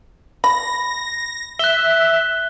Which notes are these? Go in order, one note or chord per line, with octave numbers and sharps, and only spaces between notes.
B5 A#6
E5 F#6 G7